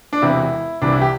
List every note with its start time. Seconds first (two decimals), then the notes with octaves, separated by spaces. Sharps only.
0.13 D4
0.22 E1 E2 C3 E3 E4
0.82 C2 C3 E3 D4
0.92 E4
1.01 G4